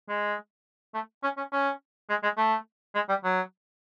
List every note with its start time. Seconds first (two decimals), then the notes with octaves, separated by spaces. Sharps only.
0.09 G#3
0.95 A3
1.23 C#4
1.37 C#4
1.52 C#4
2.10 G#3
2.23 G#3
2.37 A3
2.95 G#3
3.09 G3
3.24 F#3